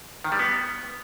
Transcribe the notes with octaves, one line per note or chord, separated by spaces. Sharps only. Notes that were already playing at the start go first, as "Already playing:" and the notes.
D#3
G3
B3